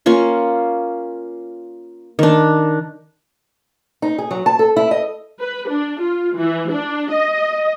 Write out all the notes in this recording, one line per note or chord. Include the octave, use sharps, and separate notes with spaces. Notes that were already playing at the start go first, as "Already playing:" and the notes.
A#3 C#4 F4 C#6
D#3 D4
D#4
G#4
F#3
A5
A4
E4
D#5
B4
D4
F4
E3
D4
D#5